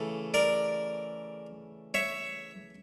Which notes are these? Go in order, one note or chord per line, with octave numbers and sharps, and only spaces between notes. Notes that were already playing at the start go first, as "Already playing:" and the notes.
Already playing: C#3 E3 A3
A#4 D5
C#5 E5